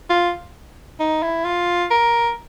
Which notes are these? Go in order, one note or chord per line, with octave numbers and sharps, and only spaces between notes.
F4
D#4
E4
F4
A#4